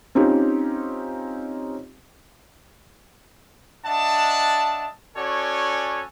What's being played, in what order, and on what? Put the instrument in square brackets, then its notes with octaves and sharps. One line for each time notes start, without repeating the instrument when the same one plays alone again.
[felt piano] C4 C#4 D#4 F4 G4
[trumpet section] D4 D#5 E5 F#5 A5
C#4 F#4 A4 C#5 D5 G#5